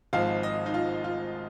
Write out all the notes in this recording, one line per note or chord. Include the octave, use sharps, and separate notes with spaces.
G#1 G#2 F3 F5
D#5
D#4
F4
F4